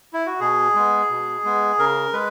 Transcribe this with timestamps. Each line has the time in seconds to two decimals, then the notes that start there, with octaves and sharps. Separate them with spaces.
0.13 E4
0.27 F#4
0.40 B2 G#4
0.75 G#3 B3
1.10 B2
1.45 G#3 B3
1.78 C#3 A#4
2.13 G#3 B4